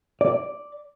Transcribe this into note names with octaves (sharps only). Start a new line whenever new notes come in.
D5